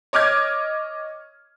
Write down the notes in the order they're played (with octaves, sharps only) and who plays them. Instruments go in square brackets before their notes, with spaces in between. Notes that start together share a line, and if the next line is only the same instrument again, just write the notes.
[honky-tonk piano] C#5 D#5 D6 F6 G#6